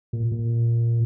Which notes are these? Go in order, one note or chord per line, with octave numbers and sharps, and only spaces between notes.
A#2
A#2